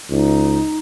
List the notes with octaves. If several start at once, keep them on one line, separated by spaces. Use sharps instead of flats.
C#2 D#4